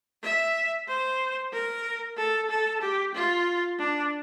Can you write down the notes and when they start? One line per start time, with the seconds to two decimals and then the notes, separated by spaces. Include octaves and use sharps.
0.23 E5
0.88 C5
1.52 A#4
2.17 A4
2.50 A4
2.81 G4
3.14 F4
3.79 D4